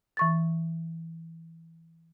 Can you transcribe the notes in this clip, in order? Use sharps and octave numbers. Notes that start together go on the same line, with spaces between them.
E3 C#6 A6